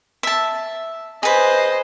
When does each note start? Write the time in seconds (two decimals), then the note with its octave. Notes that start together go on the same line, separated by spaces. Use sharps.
0.23 E5 A5
1.23 G#4 B4 C5 D#5